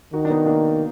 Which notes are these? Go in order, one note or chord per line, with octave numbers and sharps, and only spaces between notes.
D#3 D#4 F#4
D4
B3 D#4
A#3 D4